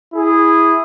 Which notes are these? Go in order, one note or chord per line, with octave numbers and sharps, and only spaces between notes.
E4 G#4